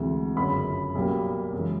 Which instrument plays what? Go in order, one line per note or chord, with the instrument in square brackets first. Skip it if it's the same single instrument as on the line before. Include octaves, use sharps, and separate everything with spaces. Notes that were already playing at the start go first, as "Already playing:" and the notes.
Already playing: [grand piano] D2 C3 E3 G#3
G1 F#2 C#3 B5
B1 B2 G3 A#3
F#2 C#3 E3 G#3